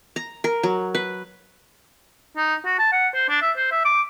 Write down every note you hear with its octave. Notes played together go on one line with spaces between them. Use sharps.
A#5
A#4
F#3
B4
D#4
F#4
A5
F#5
C5
D4
E5
C5
E5
D6